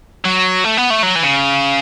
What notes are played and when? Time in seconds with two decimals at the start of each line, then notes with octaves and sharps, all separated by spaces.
0.25 F#3
0.64 A3
0.77 B3
0.90 A3
1.03 F#3
1.16 E3
1.23 C#3